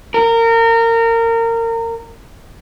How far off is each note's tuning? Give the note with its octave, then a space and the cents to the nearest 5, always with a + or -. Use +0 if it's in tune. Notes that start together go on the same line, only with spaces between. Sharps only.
A#4 -25